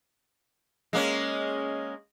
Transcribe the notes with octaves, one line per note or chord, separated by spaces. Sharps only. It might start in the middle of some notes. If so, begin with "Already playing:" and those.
G#3 A#3 C#4